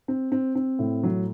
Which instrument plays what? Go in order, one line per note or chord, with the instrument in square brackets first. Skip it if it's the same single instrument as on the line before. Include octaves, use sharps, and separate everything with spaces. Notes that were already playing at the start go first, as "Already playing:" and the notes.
[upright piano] C4
C4
C4
A2
F#3